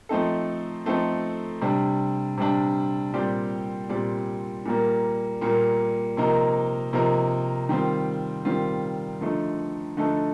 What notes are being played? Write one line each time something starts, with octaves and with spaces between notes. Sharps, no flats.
F3 A3 C4 D#4 A4
F3 A3 C4 D#4 A4
C3 G3 D4
C3 G3 D4
A#2 G3 C4 G4 D5
A#2 G3 C4 G4 D5
A#2 G3 A#3
A#2 G3 A#3
C3 F3 A#3 D#4 A#4
C3 F3 A#3 D#4 A#4
D#3 G3 C4 F4
D#3 G3 C4 F4
D3 F3 A3 D#4 A4
D3 F3 A3 D#4 A4